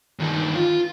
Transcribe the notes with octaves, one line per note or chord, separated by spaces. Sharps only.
G2 D#3
F4